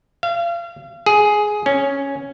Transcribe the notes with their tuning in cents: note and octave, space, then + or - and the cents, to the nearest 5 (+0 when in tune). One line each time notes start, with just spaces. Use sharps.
F5 -35
G#4 +10
C#4 +0